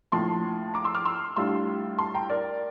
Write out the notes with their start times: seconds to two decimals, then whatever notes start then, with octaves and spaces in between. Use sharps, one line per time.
0.12 A#1 A2 F3 A5 C6
0.74 A#5 D6
0.84 C6 E6
0.95 D6 F6
1.05 C6 E6
1.36 A2 G3 D4 F4 C6 E6
1.98 A5 C6
2.14 G5 A#5
2.30 A#4 D5